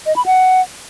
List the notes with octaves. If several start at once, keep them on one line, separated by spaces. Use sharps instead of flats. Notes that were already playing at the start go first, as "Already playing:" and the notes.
D#5
B5
F#5